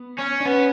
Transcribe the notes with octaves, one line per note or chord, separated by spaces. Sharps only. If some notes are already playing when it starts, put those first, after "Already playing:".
Already playing: B3
C#4
D4
B3 C#4